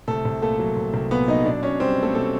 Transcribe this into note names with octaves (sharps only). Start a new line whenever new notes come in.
C2 A3 A4
C2
A#2 A3 A4
F#3
C2
C2
A#2 B3 B4
F#3 D#4 D#5
B2 D4 D5
B2 C#4 C#5
G3 C4 C5
A3 B3 A4
B2 A3 A4